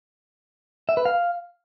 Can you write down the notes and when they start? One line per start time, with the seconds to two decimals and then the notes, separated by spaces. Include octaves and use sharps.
0.89 E5
0.97 B4
1.05 F5